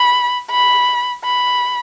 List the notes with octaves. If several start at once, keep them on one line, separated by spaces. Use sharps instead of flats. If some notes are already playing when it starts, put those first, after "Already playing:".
Already playing: B5
B5
B5